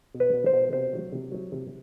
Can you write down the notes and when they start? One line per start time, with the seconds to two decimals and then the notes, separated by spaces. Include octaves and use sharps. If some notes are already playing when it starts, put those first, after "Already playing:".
0.15 B2
0.20 B4
0.33 B2
0.46 C5
0.53 B2
0.73 C3 C5
0.93 F#3
1.12 C3
1.32 F#3
1.52 C3